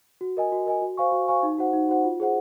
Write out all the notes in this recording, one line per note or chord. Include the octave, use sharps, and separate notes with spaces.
F#4
A#4 D#5 G#5
F#4
A#4 D#5 G#5
F#4
C5 F5 G#5 C#6
F#4
C5 F5 G#5 C#6
D#4
F#4 C5 F#5
D#4
F#4 C5 F#5
F4
G#4 C5 F#5